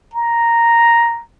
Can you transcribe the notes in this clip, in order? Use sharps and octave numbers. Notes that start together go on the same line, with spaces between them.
A#5